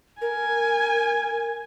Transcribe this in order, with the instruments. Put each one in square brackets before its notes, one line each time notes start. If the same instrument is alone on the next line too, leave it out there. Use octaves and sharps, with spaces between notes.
[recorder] A#4 [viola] G#5